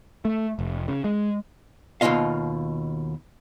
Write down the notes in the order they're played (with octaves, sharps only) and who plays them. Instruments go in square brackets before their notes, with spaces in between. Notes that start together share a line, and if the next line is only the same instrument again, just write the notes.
[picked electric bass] A3
F1
C#3
G#3
[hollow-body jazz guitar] D#2 B2 D#4 F4 D#5 F5